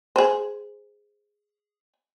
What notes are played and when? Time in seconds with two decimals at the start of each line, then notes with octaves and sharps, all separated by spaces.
0.16 G#4 C5